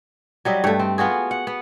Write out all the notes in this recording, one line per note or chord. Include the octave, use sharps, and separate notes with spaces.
F#3 G3 D#5 E5
G2 A3
C4
B3 F4 F#4 G#4
F#5
B3